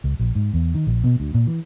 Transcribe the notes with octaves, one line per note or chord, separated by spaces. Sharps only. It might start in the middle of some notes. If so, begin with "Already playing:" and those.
C#2
A#1
G#2
E2
D#3
A#1
B2
D2
A#2
E3